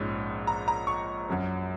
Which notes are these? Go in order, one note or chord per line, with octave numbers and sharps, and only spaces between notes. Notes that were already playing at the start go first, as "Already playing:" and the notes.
Already playing: A#1 G#2 G#3 C#4
A#5
A#5
C#6
F#2 F#3 C#4